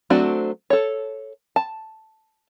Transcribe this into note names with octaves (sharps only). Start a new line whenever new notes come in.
F#3 A3 C4 D4 F#4
A4 C#5
A5